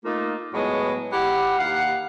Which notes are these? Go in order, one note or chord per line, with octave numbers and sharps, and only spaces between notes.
A3 A#3 D#4 F4
A2 F#3 G#3 B3
E4 G4 F#5
D#2 F5 F#5